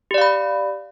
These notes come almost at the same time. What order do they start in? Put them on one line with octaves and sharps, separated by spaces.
G4 D5 F5 B5